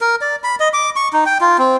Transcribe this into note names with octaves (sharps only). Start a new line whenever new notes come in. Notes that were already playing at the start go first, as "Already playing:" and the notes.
A#4
D5
B5
D#5
D6
C#6
D#4
G5
F4
C4